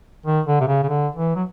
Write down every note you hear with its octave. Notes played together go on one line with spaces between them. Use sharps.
D#3
D3
C3
C#3
C#3
D3
E3
F#3